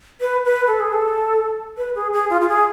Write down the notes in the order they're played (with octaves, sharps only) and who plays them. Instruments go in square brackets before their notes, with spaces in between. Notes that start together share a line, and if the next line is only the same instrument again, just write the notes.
[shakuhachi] B4
B4
A4
G#4
A4
B4
G#4
G#4
F4
F4
G#4